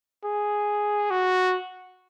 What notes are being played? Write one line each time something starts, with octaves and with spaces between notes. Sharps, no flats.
G#4
F#4